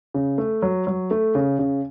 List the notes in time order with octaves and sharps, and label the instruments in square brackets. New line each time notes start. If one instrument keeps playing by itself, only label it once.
[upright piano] C#3
A3
F#3
F#3
A3
C#3
C#3